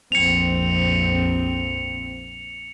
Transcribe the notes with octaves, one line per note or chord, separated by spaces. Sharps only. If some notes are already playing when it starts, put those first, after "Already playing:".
A#1 F2 C4 C#7 F7